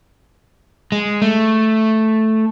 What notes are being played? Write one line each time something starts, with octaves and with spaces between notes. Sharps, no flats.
G#3
A3